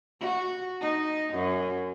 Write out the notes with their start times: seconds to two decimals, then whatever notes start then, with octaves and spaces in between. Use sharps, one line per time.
0.21 F#4
0.81 D#4
1.34 F#2